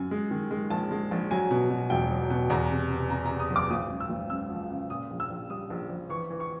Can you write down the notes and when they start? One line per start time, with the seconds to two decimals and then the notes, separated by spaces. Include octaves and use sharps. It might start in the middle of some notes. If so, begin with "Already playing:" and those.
Already playing: F#2 G#5
0.11 G#3
0.31 D#3
0.51 G#3
0.70 A#1 A5
0.91 G#3
1.11 A#1
1.31 F#3 G#5
1.51 B2
1.70 B2
1.90 E1 G5
2.11 F#3
2.30 B2
2.50 E2 A#5
2.70 C3
2.90 C3
3.10 C3 A#5
3.26 C3 A#5
3.40 D#6
3.50 F#1
3.56 D6
3.71 G#1 D#6
3.91 F#2
4.00 E6
4.10 G#1
4.30 F#2 E6
4.50 F3
4.70 C#3
4.90 A#2 D#6
5.11 A#1
5.20 E6
5.30 A#1
5.50 G3 D#6
5.70 A#1
5.89 A#1
6.09 E3 C#6
6.30 E3
6.40 C#6